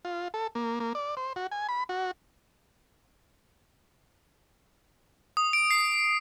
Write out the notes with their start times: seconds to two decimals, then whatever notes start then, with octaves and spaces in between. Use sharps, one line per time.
0.05 F4
0.34 A4
0.55 A#3
0.80 A#3
0.95 D5
1.17 C5
1.36 F#4
1.52 G#5
1.69 B5
1.89 F#4
5.37 D#6
5.53 D7
5.71 C7